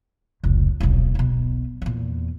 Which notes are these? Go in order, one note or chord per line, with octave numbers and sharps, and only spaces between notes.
F1 C#2
D#1 B1
B1 B2
E2 A#2